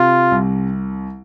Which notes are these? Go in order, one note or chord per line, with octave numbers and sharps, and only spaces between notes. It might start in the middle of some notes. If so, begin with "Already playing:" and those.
Already playing: C3 F4
C2